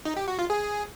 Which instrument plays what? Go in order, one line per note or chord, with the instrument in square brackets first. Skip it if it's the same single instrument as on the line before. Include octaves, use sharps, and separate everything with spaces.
[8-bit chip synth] D#4
G4
F#4
F4
G#4